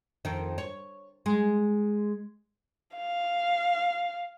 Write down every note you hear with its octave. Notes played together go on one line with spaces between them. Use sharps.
F2 D#3
C#5
G#3
F5